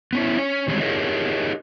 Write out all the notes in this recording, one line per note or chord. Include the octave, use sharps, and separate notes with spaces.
B3 C#4 E4
C#4
D#3 G3 G#3 C4 C#5
D#4 G4 G#4 A#4 C#5 D#5